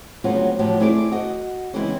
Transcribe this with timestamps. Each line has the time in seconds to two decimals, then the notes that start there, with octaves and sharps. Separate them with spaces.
0.24 D2 C#3 F#3 B3 C4 F4
0.59 A2 F3 F#3 G4
0.79 A3 C4 E4 G#4 C#5 D5
1.12 F#4 D#5
1.73 C#3 E3 G#3 B3 C4 E4